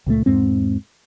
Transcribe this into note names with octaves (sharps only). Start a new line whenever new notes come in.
C#2 A#2 F#3 A3
E2 G#2 G#3 C4